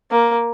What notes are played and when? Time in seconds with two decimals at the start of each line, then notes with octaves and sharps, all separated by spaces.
0.11 A#3